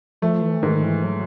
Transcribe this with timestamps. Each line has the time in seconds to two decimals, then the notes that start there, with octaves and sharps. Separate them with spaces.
0.22 F3 A3
0.42 E3
0.62 G#2 D#3
0.83 E3
1.04 F#3